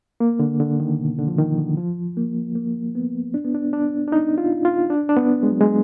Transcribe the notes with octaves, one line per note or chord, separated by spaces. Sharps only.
A#3
D3
D3
D#3
B2
D3
F3
D#3
D3
F3
A#3
A#3
B3
D4
B3
D4
D4
D4
D#4
F4
F4
D4
D4
B3
G#3
F#3
G#3